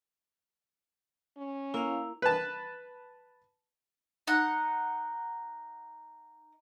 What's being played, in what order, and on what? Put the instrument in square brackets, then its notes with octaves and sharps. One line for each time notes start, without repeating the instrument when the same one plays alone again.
[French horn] C#4
[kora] A#3 [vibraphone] E4 F5
[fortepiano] B4 A5
[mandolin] D#4 F#5